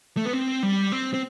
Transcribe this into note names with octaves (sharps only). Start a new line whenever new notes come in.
A3
B3
C4
G3
C4
C4